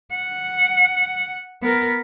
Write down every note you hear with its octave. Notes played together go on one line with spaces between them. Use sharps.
F#5
B3 A#4